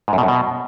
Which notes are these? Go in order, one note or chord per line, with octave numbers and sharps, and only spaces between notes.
G#2
F#2
B2
F#2
B2